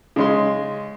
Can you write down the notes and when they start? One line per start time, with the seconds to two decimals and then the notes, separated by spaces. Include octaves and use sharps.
0.16 C#3 G#3 C6